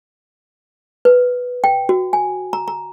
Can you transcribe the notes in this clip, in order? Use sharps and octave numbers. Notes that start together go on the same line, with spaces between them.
B4
G5
F#4
G#5
A#5
A#5